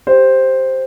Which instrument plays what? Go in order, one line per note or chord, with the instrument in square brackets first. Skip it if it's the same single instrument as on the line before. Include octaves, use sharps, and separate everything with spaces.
[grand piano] G4 C5